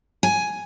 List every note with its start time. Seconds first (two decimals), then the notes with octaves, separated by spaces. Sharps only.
0.23 G#5